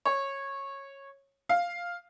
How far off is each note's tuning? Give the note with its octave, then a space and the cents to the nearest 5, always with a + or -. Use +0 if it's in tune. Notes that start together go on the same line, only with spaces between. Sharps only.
C#5 -15
F5 +0